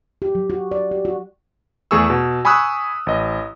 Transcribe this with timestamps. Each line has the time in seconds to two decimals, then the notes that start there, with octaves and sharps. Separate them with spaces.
0.22 G4
0.35 F#3
0.50 F#4
0.71 D5
0.91 G4
1.05 F#4
1.91 E2 A3 G#4 C#6 E6
2.10 B2
2.45 G#5 B5 C#6 D#6 E6 F#6
3.07 A1 D#5